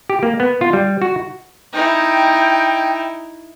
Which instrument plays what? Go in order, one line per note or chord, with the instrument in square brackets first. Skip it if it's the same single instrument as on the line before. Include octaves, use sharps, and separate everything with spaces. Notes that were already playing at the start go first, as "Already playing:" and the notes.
[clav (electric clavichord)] G4
A#3
B3
F4
G3
F#4
[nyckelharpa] D#4 E4 [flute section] G5